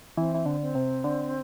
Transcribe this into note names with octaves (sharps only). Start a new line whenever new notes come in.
E3 C4
E3
D3
C4
C3
D3